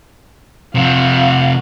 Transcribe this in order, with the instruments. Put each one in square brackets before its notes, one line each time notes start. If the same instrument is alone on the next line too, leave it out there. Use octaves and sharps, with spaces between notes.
[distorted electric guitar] C3 F3 [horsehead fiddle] F5 F#5